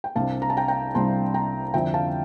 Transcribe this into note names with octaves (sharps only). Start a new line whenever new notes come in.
G5
C2 C3 G3 D4 F5 A5
A#5
A5
G5 A#5
G5 A#5
C2 C3 G3 D4 A5 C6
G5 A#5
F2 D3 F3 E5 G5
F5 A5